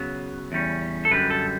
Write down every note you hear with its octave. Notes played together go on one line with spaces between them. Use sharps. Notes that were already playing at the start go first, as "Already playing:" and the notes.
Already playing: C#3 F#3 B3
E2 C#3 G3 C#4
A4
F#2 D3 G3 B4
A4